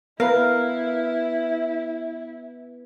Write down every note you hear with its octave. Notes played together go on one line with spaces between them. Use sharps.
B3 E4 A#4 B4 F5